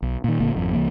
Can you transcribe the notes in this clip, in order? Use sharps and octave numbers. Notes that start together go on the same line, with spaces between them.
B1
A#2 D#3
F1 A#2 D3 A#3
G#1 F2
C2 E3 A#3